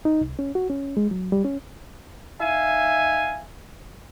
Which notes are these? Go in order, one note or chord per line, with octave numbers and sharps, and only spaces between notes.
D#4
C2
C#4
F#4
C#4
G#3
F#3
G3
C#4
D#4 E5 F5 G#5